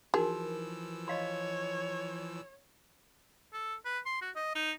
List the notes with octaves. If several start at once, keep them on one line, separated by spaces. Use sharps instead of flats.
E3 F3 D#4 F#4 G#4 A#4 E6
C#5 D#5 F5 C6
A4
B4
C6
F#4
D#5
D#4